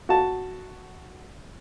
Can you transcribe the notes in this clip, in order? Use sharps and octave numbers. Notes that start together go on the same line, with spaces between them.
F#4 A5